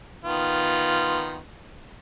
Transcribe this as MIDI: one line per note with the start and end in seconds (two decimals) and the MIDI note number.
0.25 1.40 51
0.25 1.40 59
0.25 1.40 65